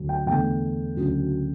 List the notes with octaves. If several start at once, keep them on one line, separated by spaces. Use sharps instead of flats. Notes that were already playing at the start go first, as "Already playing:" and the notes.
Already playing: D2 F#3
G5
E2 D3 A3 G5
D2 C#3 F#3